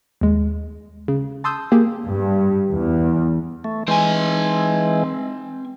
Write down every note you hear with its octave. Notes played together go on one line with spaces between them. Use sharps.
D#2 G#3
C#3
A5 C6 D#6 E6 G6
A#3 G4 G#4
G2
E2
A3
E3 G#3 C4 G#5